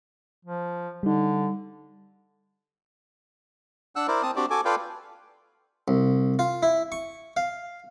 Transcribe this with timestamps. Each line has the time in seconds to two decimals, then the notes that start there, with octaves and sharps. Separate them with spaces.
0.45 F3
1.03 D3 G3 D#4
3.96 D4 F#5 E6 F#6
4.08 E4 A#4 C5 D5
4.23 C4 A5 D#6
4.36 C4 D4 F#4 G4 D5
4.50 F#4 A4 G#5 D6
4.65 F4 A4 B4 D5 F5 G5
5.88 C2
6.39 F4
6.63 E4
6.92 C#6
7.37 F5